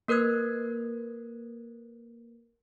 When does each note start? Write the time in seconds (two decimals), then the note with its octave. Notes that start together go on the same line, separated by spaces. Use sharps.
0.08 A#3 A#4 B4 F#6 G#6